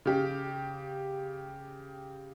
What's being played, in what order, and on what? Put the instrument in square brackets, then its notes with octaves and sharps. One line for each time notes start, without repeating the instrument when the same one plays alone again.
[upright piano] C#3 G4